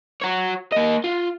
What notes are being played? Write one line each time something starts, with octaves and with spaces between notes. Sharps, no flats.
F#4 C#5
A#3 D#5
F4